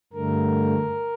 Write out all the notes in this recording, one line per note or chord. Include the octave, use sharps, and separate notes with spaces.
G2 D3 A3 A#4